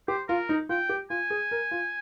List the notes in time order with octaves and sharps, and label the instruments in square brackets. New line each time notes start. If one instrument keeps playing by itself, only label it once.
[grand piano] G4 [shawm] C5
[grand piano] F4 [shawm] A#4
[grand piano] D#4
[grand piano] F4 [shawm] G5
[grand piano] G4
[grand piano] F4 [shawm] G#5
[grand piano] G#4
A#4
F4